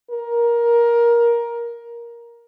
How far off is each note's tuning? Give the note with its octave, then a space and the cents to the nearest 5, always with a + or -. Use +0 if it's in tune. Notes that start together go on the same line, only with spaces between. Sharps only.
A#4 +15